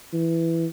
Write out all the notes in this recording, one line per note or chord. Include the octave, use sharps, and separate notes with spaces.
E3